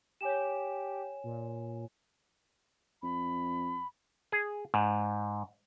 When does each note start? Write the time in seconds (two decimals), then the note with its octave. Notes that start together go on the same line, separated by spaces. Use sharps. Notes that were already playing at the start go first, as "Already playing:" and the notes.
0.21 G4 C#5 G#5 E7
1.24 A#2
3.03 F2 B5
4.32 G#4
4.74 G#2